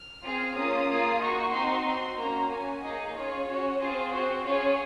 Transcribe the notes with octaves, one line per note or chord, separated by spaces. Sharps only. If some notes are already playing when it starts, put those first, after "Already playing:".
Already playing: F6
C4 F4 G#4
A#3 C#4 F4 D#6
A#3 F4 G#4
A#3 D#4 F#4 C#6
C4 D#4 F#4 C6
C4 F#4 C6
A#3 C#4 F#4 A#5
C#4 F#4 G#5
A#3 D#4 G#4 D#5
C#4 F4 G#4 C#5
C#4 F#4
C4 F4 G#4 C5
C4 F#4 C5
C#4 F4 G#4 C#5